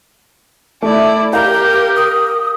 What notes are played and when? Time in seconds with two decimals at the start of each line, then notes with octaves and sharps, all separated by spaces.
0.82 A3 E4 D5
1.33 G4 A#4 F5 A#5 G6
1.96 D#6